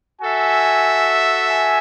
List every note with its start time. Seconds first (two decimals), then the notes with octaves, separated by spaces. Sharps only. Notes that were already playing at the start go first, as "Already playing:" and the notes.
0.21 F#4 A4 E5 G#5
1.50 G#5